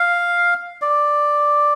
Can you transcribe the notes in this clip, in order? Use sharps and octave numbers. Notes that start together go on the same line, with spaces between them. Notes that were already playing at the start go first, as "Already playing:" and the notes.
Already playing: F5
D5